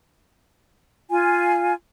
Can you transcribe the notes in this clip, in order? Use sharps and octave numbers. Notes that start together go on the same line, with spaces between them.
F4 G#5